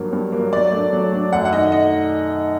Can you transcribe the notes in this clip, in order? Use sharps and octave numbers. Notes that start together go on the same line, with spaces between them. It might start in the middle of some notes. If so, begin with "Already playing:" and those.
Already playing: G2 F#3 A#3
G2
F#3 A#3
F#3 D5
A3 D4
F#3
A3 D4
F#2 F#5
F#5
D#3 A3 D#5
D#5